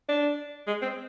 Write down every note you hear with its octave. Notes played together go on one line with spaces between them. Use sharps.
D4
G#3
C4